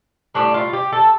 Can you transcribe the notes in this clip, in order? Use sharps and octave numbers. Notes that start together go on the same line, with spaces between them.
A2 G3 D4
F4
G4
A4